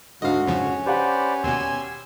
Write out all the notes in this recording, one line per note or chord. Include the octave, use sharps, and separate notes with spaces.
D2 G#2 D3 F#4 D#5 F5
F2 C#3 F3 C#4
G4 B4 C5 D5 F#5
D#2 B2 G#5 C6 E6